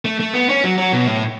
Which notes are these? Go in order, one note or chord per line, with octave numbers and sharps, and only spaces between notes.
A3
A3
B3
C#4
F#3
F#3
B2
A2